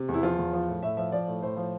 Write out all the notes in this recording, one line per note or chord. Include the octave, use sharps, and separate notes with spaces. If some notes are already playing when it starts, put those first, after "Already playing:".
Already playing: C3
E2
E4
F3 F4
E2
F3
A2
A2 E5
F3 E5
F3 D5
A2
A2 C5
F3